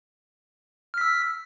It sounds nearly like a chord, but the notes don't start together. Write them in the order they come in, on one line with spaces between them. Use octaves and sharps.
F6 B6 E6